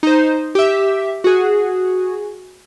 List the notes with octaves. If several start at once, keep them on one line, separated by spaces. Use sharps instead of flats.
D#4 C5
G4 E5
F#4 G#4